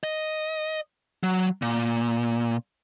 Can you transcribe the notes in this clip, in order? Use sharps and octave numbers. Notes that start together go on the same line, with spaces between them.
D#5
F#3
A#2